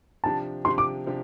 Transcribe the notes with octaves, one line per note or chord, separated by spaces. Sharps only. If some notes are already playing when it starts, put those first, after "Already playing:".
C3 F3 D4 G4 A5
C3 F3 D4 G4 C6
D6
C3 F3 D4 G4